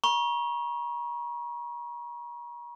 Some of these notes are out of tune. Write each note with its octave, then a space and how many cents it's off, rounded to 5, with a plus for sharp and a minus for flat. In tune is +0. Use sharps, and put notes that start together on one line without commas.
A#5 +40 C#6 -10